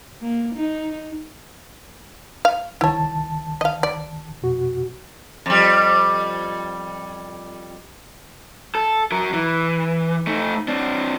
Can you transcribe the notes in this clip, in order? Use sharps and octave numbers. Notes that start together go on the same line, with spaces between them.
A#3
D#4
F5
C2 D#3 E4 C#5 A5
D#5 F5
D5
F2 B2 F#4
F2 G3
A4
F#3 A#4
E3
A3 D#4
C4 D4